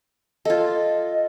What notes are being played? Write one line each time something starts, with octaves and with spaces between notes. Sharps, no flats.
F4 A4 D#5